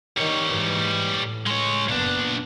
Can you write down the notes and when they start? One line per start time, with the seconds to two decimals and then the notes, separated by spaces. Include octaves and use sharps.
0.17 D#3 G3 C#5
0.48 G#2 E3
1.16 A2
1.46 G#3 C#5
1.88 F#1 A#2 B3 D4